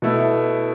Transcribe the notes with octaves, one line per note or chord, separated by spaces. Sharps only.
B2 A3 E4